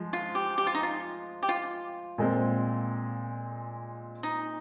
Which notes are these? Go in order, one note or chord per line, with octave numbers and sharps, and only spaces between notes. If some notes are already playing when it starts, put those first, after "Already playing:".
Already playing: F3 G#3
F4
G4
G4
F4
D#4
F4
G4
F4
A#2 G#3 C4
D#4